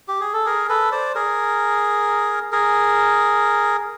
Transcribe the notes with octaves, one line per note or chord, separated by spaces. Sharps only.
G4
G#4
A4
G#4 A#4
A4 B4
C5 D5
G#4 A#4
G#4 A#4